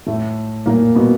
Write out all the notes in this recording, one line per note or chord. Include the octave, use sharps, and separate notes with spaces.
A2 A3
A#2 A#3
B2 B3